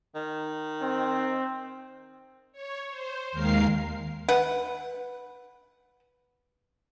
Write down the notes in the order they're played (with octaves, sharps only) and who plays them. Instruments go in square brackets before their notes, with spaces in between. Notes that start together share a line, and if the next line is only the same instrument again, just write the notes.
[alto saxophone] D#3
[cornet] C4
[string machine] C#5
C5
D#2 D#3 G#3 A#4 F5 C7
[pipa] B4 F#5